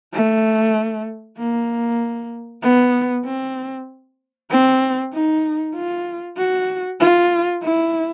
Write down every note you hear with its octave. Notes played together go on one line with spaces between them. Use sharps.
A3
A#3
B3
C4
C4
D#4
F4
F#4
F4
E4